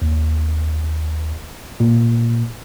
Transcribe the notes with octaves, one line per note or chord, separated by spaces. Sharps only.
D#2
A#2